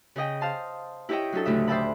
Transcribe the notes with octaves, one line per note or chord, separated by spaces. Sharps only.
C#3 G#4 D#5 G5
C5 F5 A5 C6
E4 G4 C#5 D#5 E5 G5
F#3 C#4 D4 A4
D2 A2 C#3 E5 D#6
C5 D5 E5 G5 A5 B5